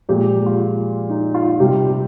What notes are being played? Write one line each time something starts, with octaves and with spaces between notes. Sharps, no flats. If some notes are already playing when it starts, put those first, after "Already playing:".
A#2 F3 G#3 G4
F4
D#4
F4
C3 G3 G4